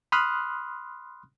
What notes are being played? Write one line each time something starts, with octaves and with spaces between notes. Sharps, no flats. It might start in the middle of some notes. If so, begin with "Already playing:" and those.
B5 C6 D#6 F6 F#6